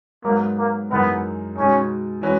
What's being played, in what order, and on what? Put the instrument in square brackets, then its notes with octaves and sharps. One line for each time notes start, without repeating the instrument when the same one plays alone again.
[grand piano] G#2 F#3 B3 D#4 A#4 [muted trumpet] A#3
[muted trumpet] A#3
[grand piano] F#2 E3 G#3 D#4 A#4 [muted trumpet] B3
[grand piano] B2 G#3 D#4 [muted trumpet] C#4
[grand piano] E3 G#3 C#4 F#4 B4